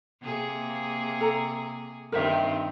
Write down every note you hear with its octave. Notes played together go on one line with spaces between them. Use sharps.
C3 A#3 G#4
A4 A#5
G2 D#3 C4 A#4 C5 E5